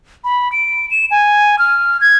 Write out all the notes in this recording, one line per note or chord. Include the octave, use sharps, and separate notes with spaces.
B5
D7
E7
G#5
F6
G#6